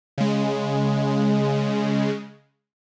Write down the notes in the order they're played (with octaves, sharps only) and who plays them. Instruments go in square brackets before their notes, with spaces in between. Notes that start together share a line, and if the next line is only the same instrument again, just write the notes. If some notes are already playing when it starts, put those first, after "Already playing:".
[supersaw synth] C#3 G#3